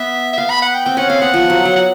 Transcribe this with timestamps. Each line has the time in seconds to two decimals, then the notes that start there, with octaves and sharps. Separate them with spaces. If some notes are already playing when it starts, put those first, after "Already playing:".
Already playing: B3 E5
0.33 E5
0.37 B3 F5
0.50 B5
0.62 F#5
0.74 G5
0.86 C4 G5
0.97 C#4 F#5
1.09 C4 F5
1.22 B3 F#5
1.34 F3
1.50 F#3
1.65 F#3
1.76 F#5